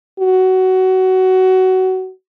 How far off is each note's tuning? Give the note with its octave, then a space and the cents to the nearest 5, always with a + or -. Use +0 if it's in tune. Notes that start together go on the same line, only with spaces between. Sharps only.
F#4 +20